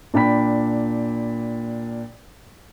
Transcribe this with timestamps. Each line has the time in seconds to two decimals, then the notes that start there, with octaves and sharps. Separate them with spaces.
0.14 A#2 D4 G5 B5 B6